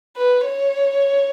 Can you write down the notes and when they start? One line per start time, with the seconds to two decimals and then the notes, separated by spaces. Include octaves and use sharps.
0.17 B4
0.45 C#5